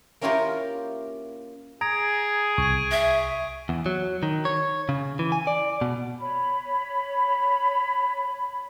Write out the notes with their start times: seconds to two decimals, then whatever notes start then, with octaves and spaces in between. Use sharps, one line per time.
0.21 A#3 C#4 E4 F4 G4 A#4
1.81 G#4 A#5 D#6 G#6 D7
2.58 C2 C#6 G#6 D#7
2.91 E5
3.69 E2
3.86 F#3
4.23 D#3
4.45 C#5
4.89 C#3
5.19 E3
5.32 G#5
5.47 D5
5.81 B2
6.20 C#5 B5